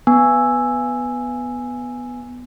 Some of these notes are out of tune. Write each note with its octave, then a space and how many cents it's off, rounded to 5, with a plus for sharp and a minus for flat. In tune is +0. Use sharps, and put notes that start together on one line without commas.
B3 +0 G#5 +0 E6 +0